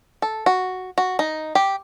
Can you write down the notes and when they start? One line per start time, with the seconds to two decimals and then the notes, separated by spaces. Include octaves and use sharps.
0.22 A4
0.46 F#4
0.98 F#4
1.19 D#4
1.55 G4